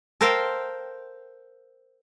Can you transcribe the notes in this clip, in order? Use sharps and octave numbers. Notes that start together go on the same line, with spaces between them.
A4 A#4 C5 F5 G5